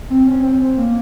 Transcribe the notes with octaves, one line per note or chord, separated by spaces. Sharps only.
C4
C#4
C4
A#3